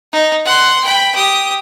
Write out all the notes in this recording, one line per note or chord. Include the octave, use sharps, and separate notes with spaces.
D#4
F#5 C6
G5 B5
G4 D#6